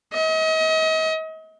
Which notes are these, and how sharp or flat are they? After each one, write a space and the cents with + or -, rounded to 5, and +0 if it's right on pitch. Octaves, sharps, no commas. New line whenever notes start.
D#5 +40